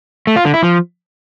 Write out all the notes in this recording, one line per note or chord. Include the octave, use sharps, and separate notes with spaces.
A3
F4
D3
E4
F3